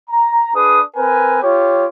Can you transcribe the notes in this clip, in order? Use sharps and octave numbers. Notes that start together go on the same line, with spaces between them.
A#5
D4 G#4 B4 D#6
C4 A#4 B4 G#5
F4 G4 C#5